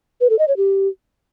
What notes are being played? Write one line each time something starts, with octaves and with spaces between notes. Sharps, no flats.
B4
A4
D#5
C#5
G4